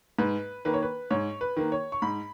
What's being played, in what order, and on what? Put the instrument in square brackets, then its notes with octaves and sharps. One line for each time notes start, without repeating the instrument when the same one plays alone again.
[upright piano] G#2 B4
D#3 A#3 B4
C#5
B4
G#2 C#5
B4
D#3 A#3
C#5
C#6
G#2 B5